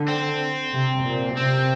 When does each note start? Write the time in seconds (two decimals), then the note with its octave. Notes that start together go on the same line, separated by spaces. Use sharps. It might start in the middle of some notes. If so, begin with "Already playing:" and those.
Already playing: D3
0.08 C4
0.72 C3
1.04 A#2
1.36 C3 C4